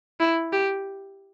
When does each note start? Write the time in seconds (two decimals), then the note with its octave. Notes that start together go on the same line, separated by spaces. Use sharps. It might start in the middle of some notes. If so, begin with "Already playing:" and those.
0.20 E4
0.53 G4